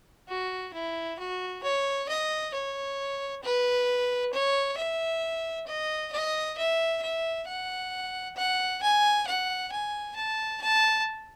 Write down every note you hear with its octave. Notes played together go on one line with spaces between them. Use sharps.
F#4
E4
F#4
C#5
D#5
C#5
B4
C#5
E5
D#5
D#5
E5
E5
F#5
F#5
G#5
F#5
G#5
A5
A5